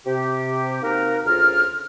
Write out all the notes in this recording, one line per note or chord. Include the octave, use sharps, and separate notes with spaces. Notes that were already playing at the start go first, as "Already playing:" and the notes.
C3 G4
A#3 C4 D#4 F#4 A#4
D2 C#3 F4 F6